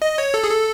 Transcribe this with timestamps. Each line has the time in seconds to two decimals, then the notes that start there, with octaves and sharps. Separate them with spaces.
0.02 D#5
0.18 C#5
0.34 A4
0.44 G#4
0.50 A4